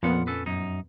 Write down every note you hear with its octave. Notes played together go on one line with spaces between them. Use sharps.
F2 A#2 F3 B3 F4 F#5
C#4 A4 B4
F#2 D#4